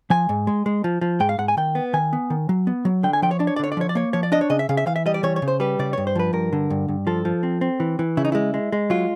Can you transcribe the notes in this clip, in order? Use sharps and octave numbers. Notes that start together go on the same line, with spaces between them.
F3 G#5
G#2
G#3
G#3
F3
F3
G#2 G5
F5
G#2 F#5
G#5
D#3 G5
B3
D#3 G#5
B3
D#3
F#3
B3
F#3
D3 G5
G#5
F3 G5
C#5
D4 D5
C#5
D5
D3 C#5
D5
F3 C#5
D5
A#3 C#5
F3 C#5
D5
D4 D#5
C#5
C#3 D#5
E5
C#3 F5
E5
E3 F5
E5
G3 D#5
D5
E3 C#5
C#5
C#3
C5
G3 B4
C#3 D5
G2 C#5
C5
F3 B4
G2 A#4
D3
G2
G2
F3 A4
F3
C4
C4
E3
E3
C#3 E4
D#4
G#3 E4
G#3
G#3
F#3 F4